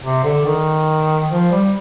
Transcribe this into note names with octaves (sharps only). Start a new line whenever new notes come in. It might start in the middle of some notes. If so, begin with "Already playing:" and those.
C3
D3
D#3
F3
G3